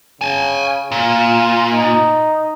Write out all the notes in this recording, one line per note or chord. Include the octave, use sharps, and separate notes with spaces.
C#3 G#5 A5
A#2 F4
D#4